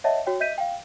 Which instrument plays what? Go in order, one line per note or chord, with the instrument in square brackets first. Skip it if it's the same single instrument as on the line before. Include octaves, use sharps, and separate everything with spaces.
[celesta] C#5 D#5 E5 F#5 A5
F#4 C#5 G5
D#5 E5 G6 B6 D#7
F5 G5